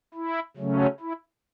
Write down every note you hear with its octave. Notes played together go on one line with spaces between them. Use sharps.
E4
C#3 F#3 A3 C#4
E4